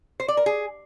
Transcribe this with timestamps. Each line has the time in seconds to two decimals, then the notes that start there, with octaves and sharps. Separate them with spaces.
0.20 C5
0.28 D5
0.37 A#4
0.46 G#4